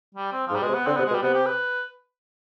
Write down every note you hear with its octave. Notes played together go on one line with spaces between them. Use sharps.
G3
C4
F3
G#2
G3
B2 G#3
C3
B3
D3 C4
C3 B3
G#3
B2
G3
C3 B3
G4
B4